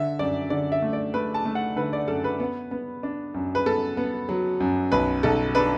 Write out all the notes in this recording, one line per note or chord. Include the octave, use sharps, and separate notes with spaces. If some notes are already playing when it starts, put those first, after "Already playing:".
Already playing: D3 E5
F#2 D5
D3 D5
E5
A3
D5
A3 B4
A5
A3
F#5
D3 B4
D5
F#2 A4
B4
B3
B3
D4
F#2
B4
B3 A4
B3
F#3
F#2
B1 B4
B1 A4
D4 B4